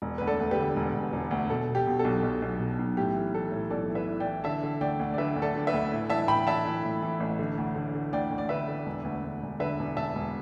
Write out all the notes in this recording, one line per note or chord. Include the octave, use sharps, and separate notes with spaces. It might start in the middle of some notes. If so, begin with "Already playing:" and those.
E1
D2 B4
A4 D5
D2
G4 B4
D3
E1
E1
E1
D2
B2 A4
B2
G4
B2
A4
B1
B1
B1
B2
B1
A2 G4
E3
E3 A4
A2
B1 A4 D5
E3
B4 E5
E3
D5 G5
E3
D3 E5 A5
D3
D2 D5 G5
D2
D5
D3 B4 E5
D2
A4 D5
D3
B4 E5
D2
A2
E3 E5 A5
A2 G5 B5
E3 E5 A5
E3
A2
E3
A1
D3
D2
D3
D3
D2 D5 G5
D2
D5
D3 B4 E5
D3
E1
D2
D2
E1
D3 B4 E5
E1
E1 E5 A5
E1